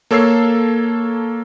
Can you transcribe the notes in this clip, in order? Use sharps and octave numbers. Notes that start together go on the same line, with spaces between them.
A#3 A4 C#5 C#6 E6 C7